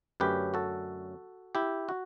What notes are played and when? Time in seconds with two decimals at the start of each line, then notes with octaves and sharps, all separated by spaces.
0.20 F#2 D3 A3 C#4 G4 B4
0.54 F#4 A4
1.55 E4 G4
1.89 F#4